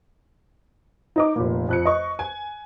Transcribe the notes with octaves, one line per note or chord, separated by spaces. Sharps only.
D#4 D#5 D6
F1 A#2
F2 F#6 C#7
D#5 C#6
G#5